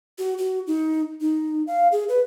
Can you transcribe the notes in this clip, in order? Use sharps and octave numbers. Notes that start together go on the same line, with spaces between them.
F#4
F#4
D#4
D#4
F5
G#4
B4